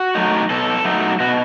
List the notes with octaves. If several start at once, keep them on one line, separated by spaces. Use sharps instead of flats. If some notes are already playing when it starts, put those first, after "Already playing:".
Already playing: F#4
F#3 A3 D#4
B2 A4
F#3 A3 D#4
B2 F#4